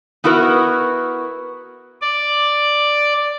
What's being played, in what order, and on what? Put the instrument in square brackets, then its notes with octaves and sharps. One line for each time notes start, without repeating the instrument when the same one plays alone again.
[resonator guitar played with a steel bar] B3 E4 F#4 A#4 B4
[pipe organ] D5